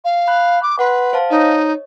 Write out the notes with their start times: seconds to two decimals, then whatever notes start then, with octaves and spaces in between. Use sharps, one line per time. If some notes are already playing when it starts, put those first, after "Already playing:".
0.05 F5
0.28 B5 F#6
0.63 D6
0.79 B4 F#5 C6
1.13 C5 F5 A5
1.30 D#4 C#5 D#5